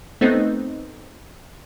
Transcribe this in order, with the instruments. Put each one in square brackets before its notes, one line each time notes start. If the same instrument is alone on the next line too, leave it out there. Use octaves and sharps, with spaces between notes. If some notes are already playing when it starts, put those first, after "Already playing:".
[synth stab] A3 B3 C4 D#4